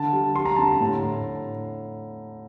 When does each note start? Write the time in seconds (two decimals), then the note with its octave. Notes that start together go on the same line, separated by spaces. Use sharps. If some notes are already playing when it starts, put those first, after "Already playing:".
Already playing: D3 A5
0.13 G3
0.35 G3 C6
0.46 A#5
0.56 D3 A5
0.68 A#5
0.80 A2
1.03 A2